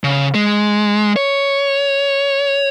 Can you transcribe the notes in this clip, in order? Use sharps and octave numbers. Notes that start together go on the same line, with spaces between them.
C#3
G#3
C#5